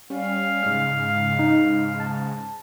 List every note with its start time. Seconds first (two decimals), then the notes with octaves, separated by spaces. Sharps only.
0.10 G3 C#4 F5
0.63 G#2 C#3 G#3 F6
1.39 D#4
2.00 A5